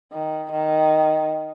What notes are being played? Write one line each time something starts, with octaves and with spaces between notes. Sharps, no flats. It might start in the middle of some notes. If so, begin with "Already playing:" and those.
D#3
D#3